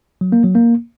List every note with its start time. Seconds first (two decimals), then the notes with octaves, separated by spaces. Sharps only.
0.21 F#3
0.32 A#3
0.44 F#3
0.55 A#3